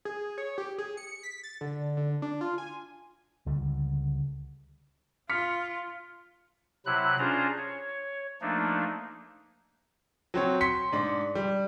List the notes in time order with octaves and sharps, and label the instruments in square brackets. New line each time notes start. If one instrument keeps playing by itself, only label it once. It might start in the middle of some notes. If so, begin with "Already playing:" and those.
[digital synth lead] G#4
C#5
G4
G#4
C#7
B6
A6
D3
D3
D4
F4
G#5
[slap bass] C#2 D3 G3
[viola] F4 [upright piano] F6 B6 C#7
[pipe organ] C3 F#3 E4 F#6
C#4 D4 F4 G#4 C5 A#5
C#5
F3 A3 A#3 D4 D#4
[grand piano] F#3 C4 C#5
C6 B6 C#7
G#2 D4
G3